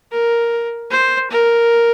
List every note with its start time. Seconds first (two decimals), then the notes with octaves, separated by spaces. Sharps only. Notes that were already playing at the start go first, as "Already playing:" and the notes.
0.12 A#4
0.90 C5
1.30 A#4